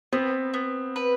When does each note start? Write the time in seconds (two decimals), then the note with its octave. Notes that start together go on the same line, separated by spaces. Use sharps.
0.13 B3 C4
0.54 B3
0.96 B4